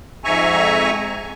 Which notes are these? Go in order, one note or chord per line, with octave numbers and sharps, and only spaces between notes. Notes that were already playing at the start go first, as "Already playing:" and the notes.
F2 G#2 E5 G#5 A#5 C#6